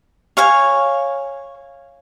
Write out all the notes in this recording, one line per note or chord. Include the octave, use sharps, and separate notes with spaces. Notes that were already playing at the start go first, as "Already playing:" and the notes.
C#5 F5 G#5